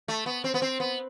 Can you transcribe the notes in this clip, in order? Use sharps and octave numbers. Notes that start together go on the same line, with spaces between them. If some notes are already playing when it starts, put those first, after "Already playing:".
A3
B3
C4
B3
C4
B3